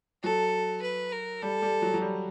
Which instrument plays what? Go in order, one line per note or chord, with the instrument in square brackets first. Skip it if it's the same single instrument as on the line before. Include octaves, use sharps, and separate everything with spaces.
[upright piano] F#3 [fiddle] A4
[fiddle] B4
A#4
[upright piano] G3 [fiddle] A4
[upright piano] G3
F#3
F#3
G3